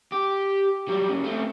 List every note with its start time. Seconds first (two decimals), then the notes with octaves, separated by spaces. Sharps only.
0.12 G4
0.88 F#3 G3
1.09 F#2 C#3
1.24 A3 C4